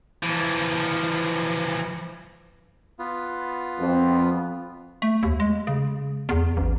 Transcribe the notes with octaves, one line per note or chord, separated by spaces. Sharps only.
E3 F3
B3 F4
F2
A3
D#2
G#3
C#3
E2
A1